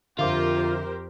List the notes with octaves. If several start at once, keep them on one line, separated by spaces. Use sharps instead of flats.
F2 D3 F4 G4 A#4 C5 E5 D6